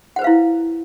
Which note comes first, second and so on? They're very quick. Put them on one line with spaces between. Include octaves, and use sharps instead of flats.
F#5 C5 B4 F5 E4